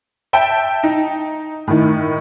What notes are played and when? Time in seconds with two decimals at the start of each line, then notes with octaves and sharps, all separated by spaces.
0.33 E5 G5 A5
0.83 D#4
1.67 A2 D#3